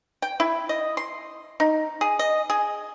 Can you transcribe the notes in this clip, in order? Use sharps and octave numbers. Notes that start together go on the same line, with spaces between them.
G5
E4
D#5
C6
D#4
G#4
D#5
G#4